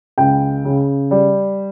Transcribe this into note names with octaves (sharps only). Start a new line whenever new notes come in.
C#2 G5
C#3
G3